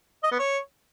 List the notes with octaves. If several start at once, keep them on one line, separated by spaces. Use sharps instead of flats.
D#5
B3
C#5